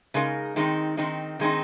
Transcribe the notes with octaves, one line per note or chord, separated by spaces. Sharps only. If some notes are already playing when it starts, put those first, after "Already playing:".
C#3 G#3 D#4 A#4
D#3 G#3 C4 D#4
D#3 G#3 C4 D#4
D#3 G#3 C4 D#4